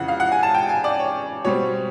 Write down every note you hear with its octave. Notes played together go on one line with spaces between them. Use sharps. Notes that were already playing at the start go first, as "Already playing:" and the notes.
Already playing: F2 C#3 E3 F#5
F5
F#5
G#5
A5
G5
G#5
D5
C#5
B2 G3 C4 C#5